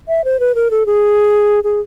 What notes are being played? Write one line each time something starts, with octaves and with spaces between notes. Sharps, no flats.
E5
C5
B4
A#4
A4
G#4
G#4